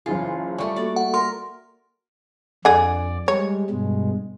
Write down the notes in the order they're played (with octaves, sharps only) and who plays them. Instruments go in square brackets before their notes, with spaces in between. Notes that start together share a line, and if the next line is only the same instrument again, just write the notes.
[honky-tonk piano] F#1 E3 G#4 [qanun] F4 [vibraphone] C#5 A5
[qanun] G3 A3 [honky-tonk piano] C#6
[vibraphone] A#3 F#4 A4 [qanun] D5
[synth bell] F#5
[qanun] A#4 [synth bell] C6
[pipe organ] F2 D5 [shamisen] D3 G#4
[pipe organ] G3 G#3 [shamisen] C#5
[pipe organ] G2 B2 G#3